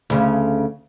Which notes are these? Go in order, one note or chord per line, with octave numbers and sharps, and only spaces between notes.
D2 C#3